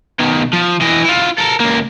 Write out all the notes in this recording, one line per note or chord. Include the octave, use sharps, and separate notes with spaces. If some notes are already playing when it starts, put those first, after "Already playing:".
B2 D#3
F3
E3 D#5
E4 F4
A4 A#4
C#2 A#3